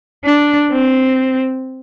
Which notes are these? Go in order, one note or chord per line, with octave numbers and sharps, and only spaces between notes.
D4
C4